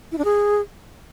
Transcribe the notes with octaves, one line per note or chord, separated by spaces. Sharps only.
E4
D4
G#4